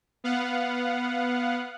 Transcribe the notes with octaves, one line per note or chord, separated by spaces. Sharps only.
B3 F5 F#5